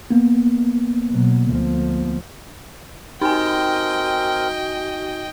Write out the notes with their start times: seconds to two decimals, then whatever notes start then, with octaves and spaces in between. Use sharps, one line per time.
0.10 A#3 B3
1.11 B2 F#3
1.48 D2 F3
3.21 C4 D#4 F#4 A#4 D#5 G5 G#5